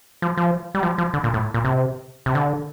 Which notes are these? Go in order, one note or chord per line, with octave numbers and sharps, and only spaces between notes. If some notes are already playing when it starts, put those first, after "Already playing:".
F3
F3
G3
F3
F3
D3
A#2
A2
A#2
C3
C3
D3